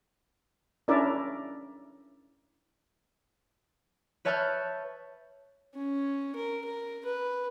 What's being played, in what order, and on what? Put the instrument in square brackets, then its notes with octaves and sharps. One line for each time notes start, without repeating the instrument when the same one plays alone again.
[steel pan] C#4 D4 E4 A#4 D5 E5
[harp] B4 C#5 E5 A5 F6 G6
[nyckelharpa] C#4
A#4
A#4
B4